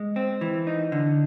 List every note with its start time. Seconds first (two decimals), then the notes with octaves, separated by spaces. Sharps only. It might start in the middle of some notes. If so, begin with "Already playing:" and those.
Already playing: G#3
0.16 C4
0.41 E3
0.67 D#4
0.92 D3